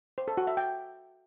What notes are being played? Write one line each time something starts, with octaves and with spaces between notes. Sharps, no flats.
C5
A4
F#4
E5
G5